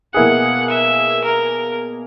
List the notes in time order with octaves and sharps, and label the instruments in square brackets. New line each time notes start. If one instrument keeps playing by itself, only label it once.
[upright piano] B2 A#3 E4 G#4 [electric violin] F#5
[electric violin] E5
A#4